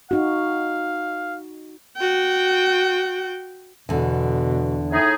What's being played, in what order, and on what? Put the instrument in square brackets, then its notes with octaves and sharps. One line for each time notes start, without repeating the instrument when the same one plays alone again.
[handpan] D#4 F#4 [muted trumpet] F5
[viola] F#4 G5
[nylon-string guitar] E2 D3 [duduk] B2
[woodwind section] A2 D#4 G#4